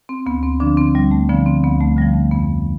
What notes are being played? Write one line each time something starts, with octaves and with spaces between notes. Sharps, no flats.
C4
D2 B3
C4
D3 F3 D4
C4
D2 G3
A3
D3 F3 B3
C4
D2 B3
A3
D3 F3 G3
A3
F2 B3